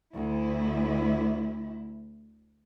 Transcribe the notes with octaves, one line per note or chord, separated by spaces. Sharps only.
D2 E4